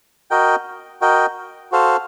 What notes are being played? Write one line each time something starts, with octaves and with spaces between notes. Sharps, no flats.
F#4 A#4 D#5 G5
F#4 A#4 D#5 G5
F#4 A4 C5 F5